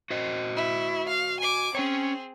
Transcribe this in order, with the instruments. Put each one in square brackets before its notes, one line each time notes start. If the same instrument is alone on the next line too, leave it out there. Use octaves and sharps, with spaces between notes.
[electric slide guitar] F#4 C5 D#5
[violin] E4
F5
G#5 D6
[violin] C4 G#4 [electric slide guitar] C#4 C#5